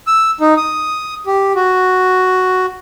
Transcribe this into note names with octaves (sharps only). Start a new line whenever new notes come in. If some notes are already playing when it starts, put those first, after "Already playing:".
E6
D#4
D#6
G4
F#4